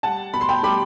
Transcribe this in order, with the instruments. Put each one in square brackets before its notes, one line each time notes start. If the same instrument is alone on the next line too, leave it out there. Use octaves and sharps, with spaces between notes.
[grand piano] G3 F#5 A5
B2 B5
C6
G5 B5
G3 B5 D6